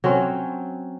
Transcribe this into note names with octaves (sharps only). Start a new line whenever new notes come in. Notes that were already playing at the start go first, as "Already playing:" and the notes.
F#3 C4 C#4